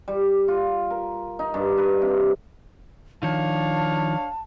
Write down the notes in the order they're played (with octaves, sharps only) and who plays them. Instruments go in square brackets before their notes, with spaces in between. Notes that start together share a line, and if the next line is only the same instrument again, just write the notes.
[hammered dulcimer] G3
F4
A#4
D#4
G2
B4
C3
[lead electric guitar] D#3 F3 [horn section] D4 C#5 F5 [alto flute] A5